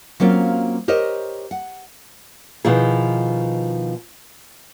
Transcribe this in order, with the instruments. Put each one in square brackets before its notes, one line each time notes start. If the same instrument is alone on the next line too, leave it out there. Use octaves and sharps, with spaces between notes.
[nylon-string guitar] F#3 A#3 C4 C#4 F4
G4 A#4 C5 C#5 D#5
F#5
B2 D#3 F3 E4 G#4